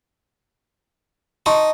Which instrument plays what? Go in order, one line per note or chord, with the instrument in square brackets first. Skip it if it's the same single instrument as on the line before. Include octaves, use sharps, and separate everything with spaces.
[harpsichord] D#4 [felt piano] A5 C6 C#6